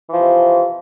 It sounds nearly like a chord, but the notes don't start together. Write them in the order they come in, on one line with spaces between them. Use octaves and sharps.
E3 F3 C3